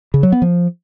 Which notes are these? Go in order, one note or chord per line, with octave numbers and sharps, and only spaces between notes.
C#3
F#3
B3
F3